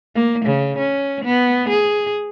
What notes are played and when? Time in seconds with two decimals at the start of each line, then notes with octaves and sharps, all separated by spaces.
0.15 A#3
0.45 C#3
0.78 C#4
1.24 B3
1.69 G#4